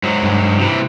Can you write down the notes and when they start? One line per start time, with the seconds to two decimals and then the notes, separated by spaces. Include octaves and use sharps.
0.03 G#2 F#3
0.23 G2
0.59 C3 E3